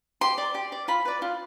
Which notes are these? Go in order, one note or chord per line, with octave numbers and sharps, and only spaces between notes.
G4 C6
D5
G4
D5
F4 B5
B4 D5
F4